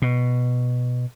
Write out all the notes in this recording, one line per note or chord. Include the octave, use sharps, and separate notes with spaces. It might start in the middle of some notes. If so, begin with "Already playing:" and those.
B2